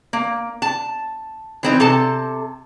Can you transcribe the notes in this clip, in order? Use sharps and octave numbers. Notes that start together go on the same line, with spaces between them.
A#3
A5
E3 C4 D#4
C3 A4 A5